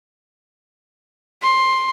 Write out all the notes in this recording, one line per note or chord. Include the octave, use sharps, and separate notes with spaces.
C6